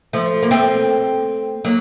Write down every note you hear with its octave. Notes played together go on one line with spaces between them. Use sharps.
F3 A3
A#3
A3 C4
F#3 A#3